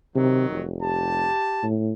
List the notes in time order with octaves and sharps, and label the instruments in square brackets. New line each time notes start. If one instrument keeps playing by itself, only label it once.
[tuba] C3 [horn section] D#3 F#3
[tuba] F1
[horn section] G4 A5
[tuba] A2